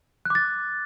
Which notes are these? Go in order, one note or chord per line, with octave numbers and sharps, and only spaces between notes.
D6 F#6 A6